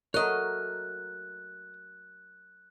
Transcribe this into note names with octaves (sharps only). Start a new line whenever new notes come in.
F#3 A3 A#4 C#5 D#5 F#6